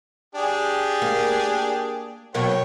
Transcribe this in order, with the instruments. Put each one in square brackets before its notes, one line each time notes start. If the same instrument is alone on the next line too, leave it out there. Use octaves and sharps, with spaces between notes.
[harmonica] D4 G4 G#4
[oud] A#3
[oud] B2 F#3 A#3 [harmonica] C#5 G5